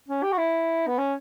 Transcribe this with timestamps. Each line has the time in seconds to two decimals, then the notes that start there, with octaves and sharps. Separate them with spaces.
0.08 C#4
0.23 G4
0.32 F#4
0.38 E4
0.87 B3
0.98 C#4